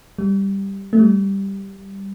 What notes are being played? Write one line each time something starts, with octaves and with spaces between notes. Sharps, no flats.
G3
A3
G3